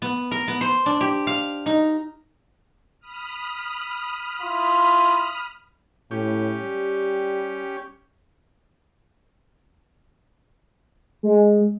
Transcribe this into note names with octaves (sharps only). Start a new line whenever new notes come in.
B3
A#4
B3
C5
D4
G4
F5
D#4
B5 D#6 F6
E4 F4
A2 C#4 G4
G3
G#3